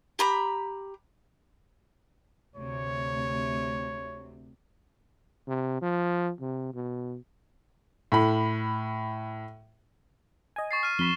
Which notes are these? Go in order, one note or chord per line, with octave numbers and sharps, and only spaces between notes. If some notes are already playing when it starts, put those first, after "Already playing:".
G4 A#5 B5
D2 C3 C#5
C3
F3
C3
B2
A2 B5
D#5 G#5
C#6 A6 C7
F6 D#7
F2 B5 E7 G7